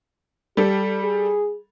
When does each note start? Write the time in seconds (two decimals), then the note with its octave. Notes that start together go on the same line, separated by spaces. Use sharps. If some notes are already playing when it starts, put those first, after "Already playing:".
0.57 G3 G4 A4
1.04 G#4